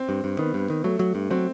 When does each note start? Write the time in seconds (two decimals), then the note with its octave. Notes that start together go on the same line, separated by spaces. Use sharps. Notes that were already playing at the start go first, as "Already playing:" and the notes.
Already playing: C4
0.09 G2
0.24 G2
0.39 D#3 B3
0.54 G2
0.70 D#3
0.84 F#3 A3
0.99 F#3
1.15 G2
1.30 F#3 C4